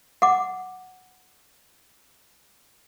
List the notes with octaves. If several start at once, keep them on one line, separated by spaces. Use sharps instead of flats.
F#5 D6